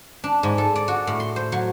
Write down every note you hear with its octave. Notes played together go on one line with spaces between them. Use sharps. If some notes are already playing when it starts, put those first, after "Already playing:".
D4
G#2
A4
D5
F#4
A2
C6
C5
F#3